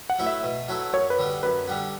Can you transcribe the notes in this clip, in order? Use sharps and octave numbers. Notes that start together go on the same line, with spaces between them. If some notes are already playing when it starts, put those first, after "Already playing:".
F#5
F#3 A3 E4 B4
E5
B2
F#3 A3 E4 B4
F#2 C#5
B4
D3 G3 B3
F#2 B4
D3 G3 B3